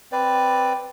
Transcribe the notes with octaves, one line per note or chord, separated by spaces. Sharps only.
C4 B4 D5